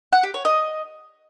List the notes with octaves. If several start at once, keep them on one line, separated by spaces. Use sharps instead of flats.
F#5
G4
C#5
D#5